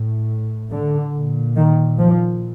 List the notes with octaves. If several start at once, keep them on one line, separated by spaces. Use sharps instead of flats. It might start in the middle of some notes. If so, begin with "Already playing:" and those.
Already playing: A2
D3
A#2
D#3
F3